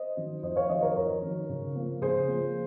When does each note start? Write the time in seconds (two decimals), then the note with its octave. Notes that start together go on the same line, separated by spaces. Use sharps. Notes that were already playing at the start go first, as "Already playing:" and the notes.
Already playing: C5 D#5
0.17 D#3 F#3
0.42 F2 C5 D#5
0.56 C#5 F5
0.69 D#3 F#3 C5 D#5
0.82 A#4 C#5
0.96 F2 A#4 C#5
1.22 D#3 F#3
1.49 C#3
1.75 F3 A#3
2.01 C#3 G#4 C5
2.28 F3 A#3